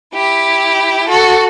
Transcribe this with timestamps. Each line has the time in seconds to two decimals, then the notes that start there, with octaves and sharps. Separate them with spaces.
0.13 E4 G4
1.07 F#4 A4